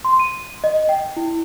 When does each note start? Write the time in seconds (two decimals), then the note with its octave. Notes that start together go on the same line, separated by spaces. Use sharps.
0.05 C6
0.20 D#7
0.64 D#5
0.89 G5
1.17 E4